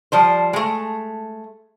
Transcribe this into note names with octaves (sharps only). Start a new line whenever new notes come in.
F3 G3 C5
G#3 A3